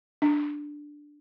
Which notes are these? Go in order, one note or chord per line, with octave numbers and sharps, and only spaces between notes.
D4